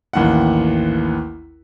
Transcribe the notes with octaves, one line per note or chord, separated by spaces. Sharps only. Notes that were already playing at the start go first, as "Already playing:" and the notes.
A1 D#2 F#5